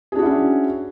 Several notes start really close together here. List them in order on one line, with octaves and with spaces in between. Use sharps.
G#4 D4 F#4 E4 C#4